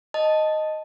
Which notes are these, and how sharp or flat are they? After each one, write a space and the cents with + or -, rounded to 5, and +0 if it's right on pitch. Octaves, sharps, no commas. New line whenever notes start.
D#5 +0 A5 +0